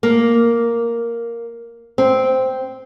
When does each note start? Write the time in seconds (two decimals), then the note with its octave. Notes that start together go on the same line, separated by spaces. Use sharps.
0.03 A#3
1.98 C4